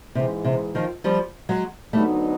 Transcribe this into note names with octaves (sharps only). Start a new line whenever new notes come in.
G#2 C3 E3 G#3
C3
D#3 F3
F3 G3
F#3 G#3
D2 D3 F#3 G3 A3 B3 D#4